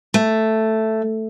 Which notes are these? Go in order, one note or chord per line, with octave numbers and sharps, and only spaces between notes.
A3